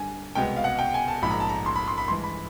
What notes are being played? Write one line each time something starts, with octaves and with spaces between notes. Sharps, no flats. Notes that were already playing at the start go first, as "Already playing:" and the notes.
Already playing: G2 D3 G3 G#5
C2 B2 G#3 B3 G5
F5
F#5
G5
G#5
A5
A#1 G#2 F3 B5
A#5
A5
A#5
C6
B5
C6
B5
G2 E3 G#3 C6
B5